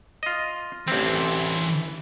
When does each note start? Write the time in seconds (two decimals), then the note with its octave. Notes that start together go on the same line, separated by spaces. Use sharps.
0.23 F4 D#5
0.88 A1 E3 C4 D4